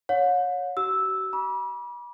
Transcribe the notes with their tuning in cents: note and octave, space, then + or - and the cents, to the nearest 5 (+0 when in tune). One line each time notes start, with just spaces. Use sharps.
C#5 +0 F#5 -45
F#4 +45 E6 -10
B5 -40 D6 -20